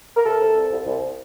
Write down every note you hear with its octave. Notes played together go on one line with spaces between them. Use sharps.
A#4
C3 A4
C3
C2
C2
C2